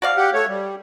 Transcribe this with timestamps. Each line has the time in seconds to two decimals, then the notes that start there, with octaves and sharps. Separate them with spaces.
0.02 F#4 D5 F5
0.17 G4 F#5
0.34 A3 C#5
0.48 G3